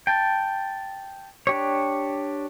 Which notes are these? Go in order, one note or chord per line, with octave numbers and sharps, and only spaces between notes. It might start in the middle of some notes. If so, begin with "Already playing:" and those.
G5 A5
D4 G4 C#5